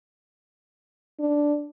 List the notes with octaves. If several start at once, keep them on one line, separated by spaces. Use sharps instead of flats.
D4